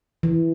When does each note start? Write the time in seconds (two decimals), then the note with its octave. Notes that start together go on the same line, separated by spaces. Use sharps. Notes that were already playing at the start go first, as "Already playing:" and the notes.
0.23 E3